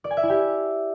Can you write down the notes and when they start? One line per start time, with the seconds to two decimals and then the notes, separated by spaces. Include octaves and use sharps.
0.04 D5
0.11 G#5
0.17 E5
0.23 E4
0.29 G4